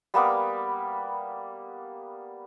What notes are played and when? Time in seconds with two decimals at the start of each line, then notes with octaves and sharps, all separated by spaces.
0.14 G3 A#3 B3 D6